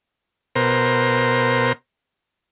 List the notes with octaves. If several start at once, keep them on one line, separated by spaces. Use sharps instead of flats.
B2 A#4 C5